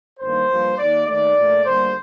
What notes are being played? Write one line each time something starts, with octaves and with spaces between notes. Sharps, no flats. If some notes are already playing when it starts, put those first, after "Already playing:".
G1 G2 D#3 A#3 C5
G2 F3 A#3
D#2 D#3 A#3 D5
D#2 D#3 A3 D5
A#1 A#2 A3
D2 D3 G3 A#3 C5